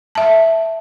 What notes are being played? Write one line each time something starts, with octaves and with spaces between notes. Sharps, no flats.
E5 A5